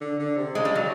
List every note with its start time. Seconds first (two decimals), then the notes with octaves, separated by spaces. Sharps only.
0.01 D3
0.19 D3
0.37 C3
0.55 C#3 G#3
0.65 G3
0.75 F#3